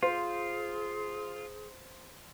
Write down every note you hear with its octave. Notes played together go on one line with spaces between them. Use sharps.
F4 G#4 C5